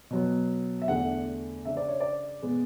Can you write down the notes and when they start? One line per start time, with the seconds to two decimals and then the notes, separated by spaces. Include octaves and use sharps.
0.10 B2 F#3 B3
0.82 E5
0.88 E2 D3 A3 E4 F#5
1.65 C#3 G#3 D4 E5
1.77 D5
1.88 C#5
2.00 D5
2.43 B2 G#3 B3